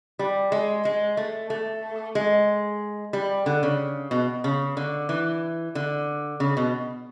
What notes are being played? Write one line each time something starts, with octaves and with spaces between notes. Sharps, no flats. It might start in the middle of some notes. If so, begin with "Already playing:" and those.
G3
G#3
G#3
A3
A3
G#3
G3
D3
C#3
B2
C#3
D3
E3
D3
C#3
B2